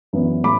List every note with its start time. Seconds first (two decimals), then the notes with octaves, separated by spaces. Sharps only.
0.13 F#2 E3 B3 D4
0.43 A2 B5 D6